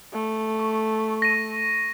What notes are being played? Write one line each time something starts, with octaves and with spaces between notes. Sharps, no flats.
A3
C#6
A#6 D#7